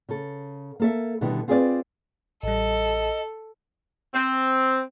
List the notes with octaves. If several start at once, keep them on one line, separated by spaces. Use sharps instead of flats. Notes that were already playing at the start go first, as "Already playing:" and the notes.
C#3 A4
A#3 A4 E5
B2 D3 D#3 G3 B3 E4
C4 F4 G#4 B4 C5 D5
A1 G3 A4 D#5
C4